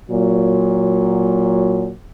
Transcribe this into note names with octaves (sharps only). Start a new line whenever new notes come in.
A#2 F#3